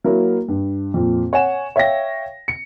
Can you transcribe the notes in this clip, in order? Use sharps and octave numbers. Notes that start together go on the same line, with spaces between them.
F#3 A#3 E4 F#4 A#4
G2
F2 A#2
C#5 F#5 G#5 E7
C#5 E5 F5 G5 A#6
C#7